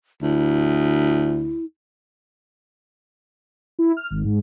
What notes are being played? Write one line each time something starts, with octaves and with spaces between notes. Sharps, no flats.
D2 E4
E4
F6
G#1
G#2